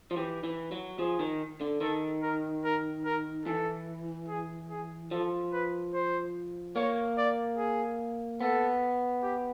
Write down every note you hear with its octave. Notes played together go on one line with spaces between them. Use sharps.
F3
E3 G4
E3
F#3
F3 G#4
D#3
D3
D#3 A4
A#4
A#4
A#4
E3 A4
G#4
G#4
F3 A4
B4
C5
A#3 C#5
D5
G#4
B3 A4
G4